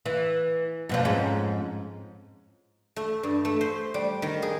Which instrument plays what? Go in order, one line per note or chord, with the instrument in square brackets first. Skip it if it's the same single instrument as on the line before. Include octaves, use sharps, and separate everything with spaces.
[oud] E3
F#2 B2 F3
F2 G#2 C#4
[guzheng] A3
G2
A3
C5
G3
D#3
G#4